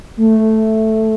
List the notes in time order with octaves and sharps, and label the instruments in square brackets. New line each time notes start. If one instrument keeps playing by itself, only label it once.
[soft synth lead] A3